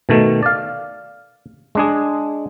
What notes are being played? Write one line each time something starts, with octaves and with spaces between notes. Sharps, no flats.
B2 D#3 A3
D5 F5
G#3 D4 G#4